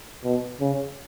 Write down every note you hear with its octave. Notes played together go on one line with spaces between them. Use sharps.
B2
C#3